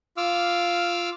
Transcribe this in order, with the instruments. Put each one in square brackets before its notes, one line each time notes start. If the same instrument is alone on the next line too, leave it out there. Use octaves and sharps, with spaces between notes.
[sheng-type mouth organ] F4 F5 D6 E6 F6